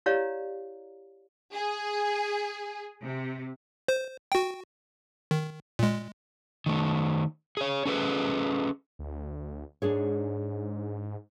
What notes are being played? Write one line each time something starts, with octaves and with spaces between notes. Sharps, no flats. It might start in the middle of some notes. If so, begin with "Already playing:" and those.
E4 G4 C#5 D5 F5 A#5
G#4
C3
C5
F#4 G5
D#3
A#2 G#3
D#3 A3
G#4 C#5
C#4 G#4 A4 B4
D2
G#2 D4 G#4 C#5